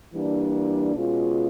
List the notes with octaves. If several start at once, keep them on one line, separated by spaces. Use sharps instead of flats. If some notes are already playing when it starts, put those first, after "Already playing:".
E3 G3 A#3 D4
B2 G#3 C#4 F4